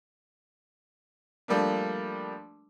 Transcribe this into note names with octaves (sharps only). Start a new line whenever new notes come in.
F3 G3 A3 A#3 D4